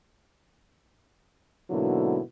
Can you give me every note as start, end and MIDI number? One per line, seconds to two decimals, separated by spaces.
1.70 2.20 44
1.70 2.20 47
1.70 2.20 50
1.70 2.20 54
1.70 2.20 58
1.70 2.20 64